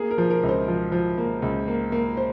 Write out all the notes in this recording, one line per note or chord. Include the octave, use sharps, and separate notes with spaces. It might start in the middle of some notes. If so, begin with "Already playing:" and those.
Already playing: A#3 G#4
A#4
F3
A#4
C#2
C5
F3
F3
A#3
C#2
A#3
A#3
C5